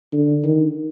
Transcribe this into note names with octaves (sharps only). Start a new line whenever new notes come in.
D3
D#3